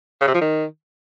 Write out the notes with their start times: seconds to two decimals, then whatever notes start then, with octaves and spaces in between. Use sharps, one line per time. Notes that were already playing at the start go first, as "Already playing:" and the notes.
0.21 C#3
0.27 C3
0.34 F3
0.41 D#3